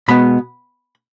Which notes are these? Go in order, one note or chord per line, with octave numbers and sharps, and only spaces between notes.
B2 G#3 B3 B5